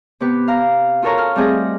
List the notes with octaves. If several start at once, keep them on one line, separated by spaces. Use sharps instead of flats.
C3 B3 G4 B4
F5 A#5
F4 F#4 A4 A#4 C#5 A#5
A4 F6
G3 A3 C4 G#4 D#5